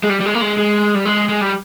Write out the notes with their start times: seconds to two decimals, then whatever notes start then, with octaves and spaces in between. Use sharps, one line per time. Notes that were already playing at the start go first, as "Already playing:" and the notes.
0.04 G#3
0.10 G3
0.21 G3
0.26 G#3
0.35 A#3
0.42 G#3
0.58 G#3
0.96 G3
1.06 G#3
1.29 G#3
1.41 G3